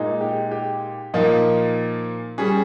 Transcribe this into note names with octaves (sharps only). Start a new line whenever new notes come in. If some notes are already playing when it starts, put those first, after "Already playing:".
Already playing: A#2 G#3 D#4
G4
G4
A#2 F3 A#3 D#4
G3 C#4 G#4